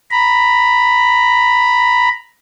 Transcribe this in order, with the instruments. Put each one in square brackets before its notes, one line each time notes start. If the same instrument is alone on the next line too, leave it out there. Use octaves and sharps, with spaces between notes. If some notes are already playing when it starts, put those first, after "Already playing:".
[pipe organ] A#5 B5